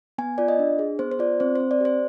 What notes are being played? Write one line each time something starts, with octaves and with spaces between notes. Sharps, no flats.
B3 G#5
F4 D5
D#5
D4
G#4
B3 C5
C5
F4 D5
C4 C5
C4 C5
D5
G4 C5